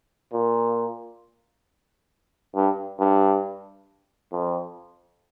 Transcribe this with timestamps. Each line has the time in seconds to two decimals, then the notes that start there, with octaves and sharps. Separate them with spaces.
0.33 A#2
2.56 G2
3.00 G2
4.32 F2